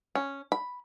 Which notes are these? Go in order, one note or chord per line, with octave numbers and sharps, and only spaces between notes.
C#4
B5